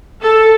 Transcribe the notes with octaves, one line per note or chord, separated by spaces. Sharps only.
A4